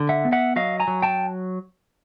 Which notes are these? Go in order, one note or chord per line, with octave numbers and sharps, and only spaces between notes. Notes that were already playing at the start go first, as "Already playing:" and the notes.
Already playing: D3
E5 F#5
B3
E5 F#5
F#3 D#5 F5
G#5 A#5
F#3
G5 A5